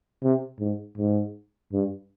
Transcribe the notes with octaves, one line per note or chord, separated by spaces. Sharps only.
C3
G#2
G#2
G2